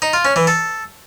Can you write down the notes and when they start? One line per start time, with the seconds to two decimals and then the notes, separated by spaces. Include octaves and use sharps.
0.02 D#4
0.13 F4
0.25 C#4
0.36 E3
0.47 A4